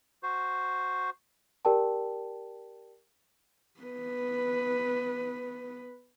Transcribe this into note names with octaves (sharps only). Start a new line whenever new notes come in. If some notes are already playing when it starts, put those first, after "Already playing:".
F#4 C5
G4 A#4 D5 G5 A5
B3 B4